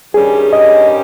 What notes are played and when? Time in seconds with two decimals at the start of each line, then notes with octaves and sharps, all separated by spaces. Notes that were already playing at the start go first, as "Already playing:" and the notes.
0.14 G2 D#3 G3 C#4 G4 G#4
0.53 D#5